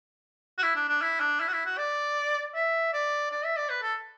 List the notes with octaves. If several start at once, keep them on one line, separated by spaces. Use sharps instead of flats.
F#4
E4
D4
D4
E4
D4
E4
F#4
E4
F#4
D5
E5
D5
D5
E5
D5
B4
A4